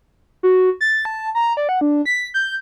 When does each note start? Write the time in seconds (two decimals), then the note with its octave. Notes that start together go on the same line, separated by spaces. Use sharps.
0.43 F#4
0.81 A6
1.05 A5
1.35 A#5
1.57 D5
1.69 F#5
1.81 D4
2.06 B6
2.34 G6